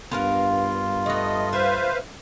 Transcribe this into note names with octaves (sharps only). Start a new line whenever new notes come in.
G2 B3 F4 A#4 F5
A3 B3 D#5
B4 C5 E5 F5